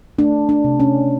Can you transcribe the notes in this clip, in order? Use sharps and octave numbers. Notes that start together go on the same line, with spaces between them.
A3 D4
D4
C3
C#4